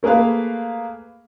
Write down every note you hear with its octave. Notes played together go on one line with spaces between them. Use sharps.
A3 A#3 G#4 B4 F5